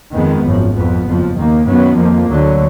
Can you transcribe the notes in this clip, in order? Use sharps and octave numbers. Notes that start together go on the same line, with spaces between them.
F2 D#3 G#3 B3
G#1 F#2 F3
F2 F3 B3
F#1 F2 F3
D#2 D#3 A#3
F#2 D#3 F#3 B3
F2 F3 A#3
D2 D3 F#3